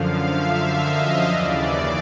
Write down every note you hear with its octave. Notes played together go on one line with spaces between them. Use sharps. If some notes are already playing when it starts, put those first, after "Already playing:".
Already playing: F#2 D3 F3 F5
E5
D#5
D#2 C#3 E3 D5